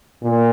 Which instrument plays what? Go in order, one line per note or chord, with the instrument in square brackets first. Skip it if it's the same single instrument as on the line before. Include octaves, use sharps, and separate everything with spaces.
[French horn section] A#2